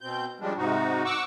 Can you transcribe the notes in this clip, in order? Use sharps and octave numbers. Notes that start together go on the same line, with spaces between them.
B2 C4 G6
C#3 F3 G3 G#3 D4
G#2 C3 D#4 F#4
F#5 C#6 D6 E6